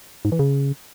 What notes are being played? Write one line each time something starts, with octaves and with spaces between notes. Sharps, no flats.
G#2
E3
C#3